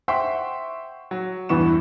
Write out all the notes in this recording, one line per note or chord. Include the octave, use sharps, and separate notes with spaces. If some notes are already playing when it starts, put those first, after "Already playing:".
C5 E5 F#5 G5 C6 C#6
F#3
E2 G2 E3 B3 C#6 E7